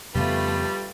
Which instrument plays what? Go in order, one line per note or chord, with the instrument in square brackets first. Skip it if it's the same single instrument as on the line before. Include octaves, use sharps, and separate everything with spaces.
[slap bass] F2 C#3 B3 [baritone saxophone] G3 [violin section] A3 F4 B4